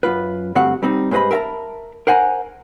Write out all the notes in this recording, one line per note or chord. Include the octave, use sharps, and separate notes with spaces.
F#2 F4 B4
G2 D3 A3 C4 F#4 F#5
G3 C4 D#4
G2 G#3 B4 C5 D#5 B5
A#4 E5 F5 A5 A#5
A#4 C5 F#5 G#5 A#5